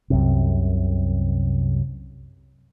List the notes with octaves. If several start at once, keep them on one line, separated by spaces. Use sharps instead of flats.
C2 F#2 C3